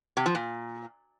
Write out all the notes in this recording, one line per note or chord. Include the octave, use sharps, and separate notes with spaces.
C3
F3
A#2